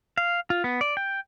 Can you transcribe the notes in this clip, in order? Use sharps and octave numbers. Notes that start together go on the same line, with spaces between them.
F5
F4
B3
D5
G5